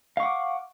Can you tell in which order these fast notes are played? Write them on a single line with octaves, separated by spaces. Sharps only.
F5 C#6 F#5 D6